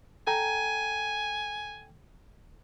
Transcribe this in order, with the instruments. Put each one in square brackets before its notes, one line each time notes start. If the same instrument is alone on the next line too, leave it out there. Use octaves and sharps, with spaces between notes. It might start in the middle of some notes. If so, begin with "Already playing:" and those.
[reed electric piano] A4 G5 A#5 [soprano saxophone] G#5